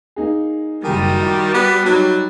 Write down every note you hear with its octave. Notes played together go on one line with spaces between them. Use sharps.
A#3 D#4 G#4
F#1 D#3 G3 F#4 G#5
E4 D6
B3
F#3 D#4 B5